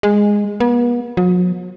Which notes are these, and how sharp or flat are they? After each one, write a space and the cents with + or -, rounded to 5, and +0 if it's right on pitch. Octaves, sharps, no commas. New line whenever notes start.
G#3 -10
B3 -40
F#3 -45